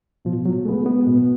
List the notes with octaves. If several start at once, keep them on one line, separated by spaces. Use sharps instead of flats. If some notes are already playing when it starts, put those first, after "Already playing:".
B2 F3
F#3
G#3 A3 B3
B3
B2